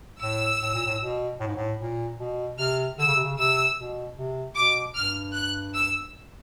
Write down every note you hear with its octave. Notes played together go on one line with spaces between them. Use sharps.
A2 E6
A2
A#2
A2
B2
A2
G#2
A2
A#2
B2
C3 F6
D3 E6
C#3
C3
C#3
C3 E6
B2
C3
B2 D6
G2 F6
F#6
E6